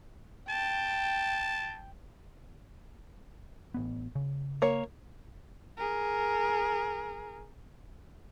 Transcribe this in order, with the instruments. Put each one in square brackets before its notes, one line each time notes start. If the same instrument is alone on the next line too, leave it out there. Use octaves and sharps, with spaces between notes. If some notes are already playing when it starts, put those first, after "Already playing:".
[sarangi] G5 [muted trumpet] A5
[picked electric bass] A1 B3
C#3
[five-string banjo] A#3 C#5
[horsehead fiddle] G#4 A#4